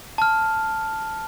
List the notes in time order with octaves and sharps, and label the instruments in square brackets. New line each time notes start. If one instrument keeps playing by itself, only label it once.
[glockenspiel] A5 F6